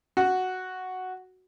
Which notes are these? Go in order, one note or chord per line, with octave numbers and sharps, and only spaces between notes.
F#4